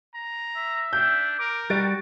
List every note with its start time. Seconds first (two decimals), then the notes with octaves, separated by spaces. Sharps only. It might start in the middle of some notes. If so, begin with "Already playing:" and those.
0.14 A#5
0.56 E5
0.93 D4 G6
1.39 A#4 D6
1.70 G3 F#4 A6 D7